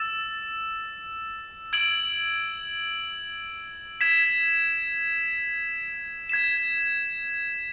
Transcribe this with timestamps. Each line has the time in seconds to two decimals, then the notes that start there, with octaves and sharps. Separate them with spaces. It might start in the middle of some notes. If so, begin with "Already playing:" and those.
Already playing: E6 A6 E7
1.73 E6 G#6 D7 F#7
4.01 G#6 B6 E7
6.29 G#6 B6 E7